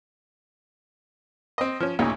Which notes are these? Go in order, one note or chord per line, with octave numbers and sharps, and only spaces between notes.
C4 D#5
F3 C#4
A1 D2 A#2 C#3 D#4 C#5